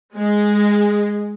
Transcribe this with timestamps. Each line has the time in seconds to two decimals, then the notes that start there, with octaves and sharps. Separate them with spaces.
0.16 G#3